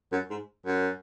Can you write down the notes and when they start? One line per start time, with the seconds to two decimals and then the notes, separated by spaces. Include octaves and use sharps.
0.12 F#2
0.30 G#2
0.66 F#2